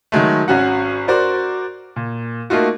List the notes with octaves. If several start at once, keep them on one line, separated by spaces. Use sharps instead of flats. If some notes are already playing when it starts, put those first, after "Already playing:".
D#3 F#3 G#3 A3
G#1 C#4 F#4 F#5
F#4 A#4 C5 D5
A#2
A3 A#3 D#4 F4 F#4